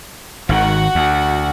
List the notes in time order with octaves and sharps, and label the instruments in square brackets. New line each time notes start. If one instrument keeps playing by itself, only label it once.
[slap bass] G#1 D#3 [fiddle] F#4 F#5
[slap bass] D2